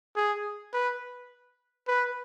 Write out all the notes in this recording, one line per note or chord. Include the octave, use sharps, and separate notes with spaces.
G#4
B4
B4